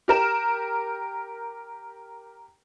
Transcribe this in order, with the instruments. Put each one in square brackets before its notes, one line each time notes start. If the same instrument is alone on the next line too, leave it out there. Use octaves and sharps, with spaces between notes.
[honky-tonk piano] G4 A#4 E7